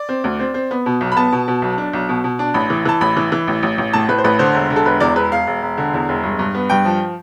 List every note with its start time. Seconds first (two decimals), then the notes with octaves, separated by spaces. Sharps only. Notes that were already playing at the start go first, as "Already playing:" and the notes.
Already playing: D5
0.09 C4
0.24 D2
0.39 C4
0.54 C4
0.71 B3
0.86 B2
1.01 B1
1.12 B5
1.17 B3 A5
1.32 B2
1.48 B2
1.62 B1
1.78 D4
1.93 B1
2.09 B2
2.24 B2
2.39 D4
2.54 A1 B5
2.70 E3
2.85 E3 A5
3.01 A1 B5
3.17 E3
3.32 E3
3.48 A1
3.63 A1
3.78 A1
3.93 A2 A5
4.08 A2 B4
4.18 C5
4.24 A1 B4
4.39 D3 C5
4.55 E1
4.70 D3
4.76 A4
4.85 E1 B4
5.00 E2 D5
5.16 E1 B4
5.32 E1 F5
5.47 E1
5.62 E1
5.78 D3
5.94 E2
6.09 E1
6.24 G2
6.39 G2
6.55 B3
6.70 G2 G5
6.85 F3